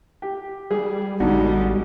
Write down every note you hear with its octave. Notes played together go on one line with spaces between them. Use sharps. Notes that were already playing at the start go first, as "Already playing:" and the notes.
G4
G3 G#4
A1 B2 D3 G3 G#3 D#4